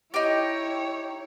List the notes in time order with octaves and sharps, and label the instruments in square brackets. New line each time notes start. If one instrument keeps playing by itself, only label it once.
[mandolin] D#4 G4 [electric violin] E4 C#5